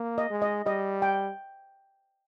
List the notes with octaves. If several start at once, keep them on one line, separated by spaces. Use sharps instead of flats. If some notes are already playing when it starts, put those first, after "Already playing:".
Already playing: A#3
D#5
G#3
D#5
G3 D#5
G5